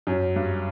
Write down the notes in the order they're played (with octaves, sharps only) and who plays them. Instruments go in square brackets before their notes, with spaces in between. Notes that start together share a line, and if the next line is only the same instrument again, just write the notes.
[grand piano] F#2
G2